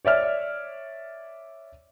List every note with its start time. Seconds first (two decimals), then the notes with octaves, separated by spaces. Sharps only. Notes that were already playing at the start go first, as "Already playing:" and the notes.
0.05 C#5 D5 E5 F6